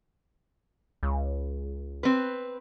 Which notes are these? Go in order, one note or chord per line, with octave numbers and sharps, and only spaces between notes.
C#2
C4 B4